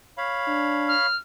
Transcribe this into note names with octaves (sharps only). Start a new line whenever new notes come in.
C#5 F5 B5
D4
F6